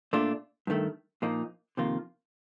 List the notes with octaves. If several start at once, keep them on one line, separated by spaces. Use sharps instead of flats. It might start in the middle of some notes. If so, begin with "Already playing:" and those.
A#2 A3 D4 F4
G2 D#3 A3
A#2 F3 A#3 D#4
F2 C3 D#3 A#3 F4